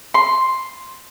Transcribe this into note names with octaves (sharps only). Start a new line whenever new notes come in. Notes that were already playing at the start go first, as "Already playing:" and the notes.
C6